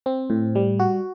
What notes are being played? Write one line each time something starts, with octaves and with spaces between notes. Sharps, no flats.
C4
A2
G3
F#4